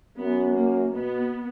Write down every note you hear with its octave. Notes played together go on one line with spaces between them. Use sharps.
F#2 B3
A#3
B2 B3